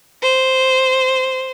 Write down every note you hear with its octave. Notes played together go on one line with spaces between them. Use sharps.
C5